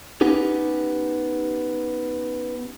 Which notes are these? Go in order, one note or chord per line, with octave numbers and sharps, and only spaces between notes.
B3 C#4 D#4 G4